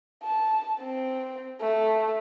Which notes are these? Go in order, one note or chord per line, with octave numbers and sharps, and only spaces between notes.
A5
C4
A3